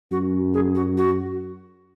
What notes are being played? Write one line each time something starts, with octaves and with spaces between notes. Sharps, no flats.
F#2 F#4
G#4
F#4
F#4